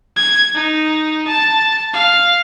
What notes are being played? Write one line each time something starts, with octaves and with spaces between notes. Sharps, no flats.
G#6
D#4
A5
F5